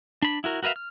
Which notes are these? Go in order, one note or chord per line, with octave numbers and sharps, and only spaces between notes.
D4 B5
E4 F#4 A#4
F#4 A#4 B4 E5 F5
F6